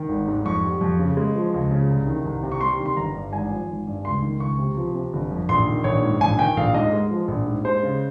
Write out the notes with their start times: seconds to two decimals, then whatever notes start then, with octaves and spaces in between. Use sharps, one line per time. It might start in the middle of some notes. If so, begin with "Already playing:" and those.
Already playing: D#3
0.09 G#1
0.28 G#2
0.45 F2 C#6
0.64 G3
0.81 F2
0.99 C#3
1.17 G#3
1.35 F3
1.54 C#2
1.71 C#3
1.89 C2
2.07 D#3
2.25 C2
2.43 C3
2.52 C#6
2.61 G3 C6
2.79 D#3
2.86 C6
2.96 G1 A#5
3.15 G2
3.33 G#1 G#5
3.51 F3
3.69 G#1
3.87 G2
4.05 C#2 C6
4.22 D#3
4.40 C#2 C#6
4.59 C3
4.77 F3
4.95 C3
5.13 G1
5.31 F2
5.49 A#1 C6
5.67 D#3
5.84 A#1 C#5
6.02 G#2
6.20 A#1 G#5
6.38 D#3 G5
6.57 A#1 F5
6.74 G#2 D#5
6.93 G#3
7.11 F3
7.28 A#1
7.47 G#2
7.65 G#3 C5
7.83 C#3